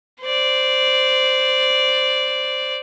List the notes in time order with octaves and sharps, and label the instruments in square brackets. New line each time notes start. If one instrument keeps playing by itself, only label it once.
[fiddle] C5 D5